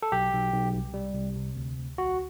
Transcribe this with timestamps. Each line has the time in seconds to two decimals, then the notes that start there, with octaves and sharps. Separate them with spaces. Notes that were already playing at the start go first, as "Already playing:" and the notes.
0.02 A4
0.12 B1 G4
0.33 B1
0.53 B1
0.74 C2
0.94 G3
1.14 C2
1.36 C3
1.56 D2
1.77 D2
1.98 B1 F#4